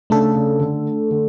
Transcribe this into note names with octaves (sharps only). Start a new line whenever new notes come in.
C#3 A3 D4 A4
C#3
D3
D3